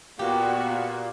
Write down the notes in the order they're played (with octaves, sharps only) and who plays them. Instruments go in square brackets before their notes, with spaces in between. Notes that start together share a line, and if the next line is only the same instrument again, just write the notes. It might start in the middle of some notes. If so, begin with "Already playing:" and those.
[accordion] A#2 A#3 [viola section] B3 F#4 [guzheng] G4